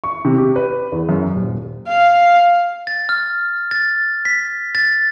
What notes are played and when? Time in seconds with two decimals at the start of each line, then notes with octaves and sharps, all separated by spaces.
0.04 C#6
0.25 C3
0.38 G4
0.56 B4
0.92 E2
1.09 F#2
1.36 D#1
1.88 F5
2.87 A6
3.09 F6
3.71 A6
4.25 B6
4.75 A6